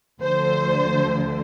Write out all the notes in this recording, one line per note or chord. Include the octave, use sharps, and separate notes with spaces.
D2 D3 F3 C5